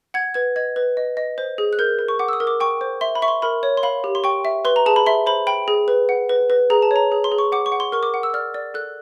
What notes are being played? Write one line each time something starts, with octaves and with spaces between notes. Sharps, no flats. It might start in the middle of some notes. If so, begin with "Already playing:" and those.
F#5 G#6
B4 G#6
D#5 G#6
B4
D#5
D#5
C5
G#4
F#6
A#4 G6
A#4
C#6
F#5 D6
E6
D#6
A#4
D6
G5 C#6
C5
E5 C6
B5
E5 C#6
C6
A#4 B5
C#5
C6
F5 B5
G4
C6
G5 C#6
E5
B4 C6
A#5
G#4 A5
B5
E5 C6
C5 B5
G5 B5
G#4
B4
F#5
B4
B4
G#4 A#5
A5
C#5 A#5
G#4
C6
G#4
C#6
F#5 D6
C#6
F#5
C6
A#4 C#6
D6
F#5
E6
D5 F6
D5
A4 F#6